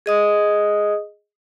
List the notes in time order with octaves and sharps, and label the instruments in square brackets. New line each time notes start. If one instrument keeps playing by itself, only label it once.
[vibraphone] G#4 D#5 D#6